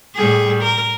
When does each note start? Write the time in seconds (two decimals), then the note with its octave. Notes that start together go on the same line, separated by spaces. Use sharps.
0.15 A2 G3 G#4
0.62 A#4